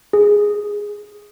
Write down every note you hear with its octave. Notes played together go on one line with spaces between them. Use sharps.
G#4